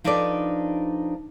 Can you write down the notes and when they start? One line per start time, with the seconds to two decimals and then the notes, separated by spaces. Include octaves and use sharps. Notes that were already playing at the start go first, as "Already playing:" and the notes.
0.04 F3 D4 D#4 A4 B4 D5